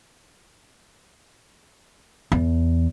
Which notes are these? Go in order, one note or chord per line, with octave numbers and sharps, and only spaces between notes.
E2